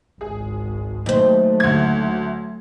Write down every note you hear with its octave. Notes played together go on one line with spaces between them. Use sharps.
G#1 C#2 G#4
D#2 F#3 A3 C5
D2 G#6